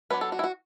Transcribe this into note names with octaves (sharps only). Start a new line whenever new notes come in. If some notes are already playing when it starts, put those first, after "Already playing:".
F#3 B3 D4 B4
A4
F#4
E4
F#4